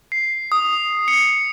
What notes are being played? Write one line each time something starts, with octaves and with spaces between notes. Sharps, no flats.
C7
D#6
C#7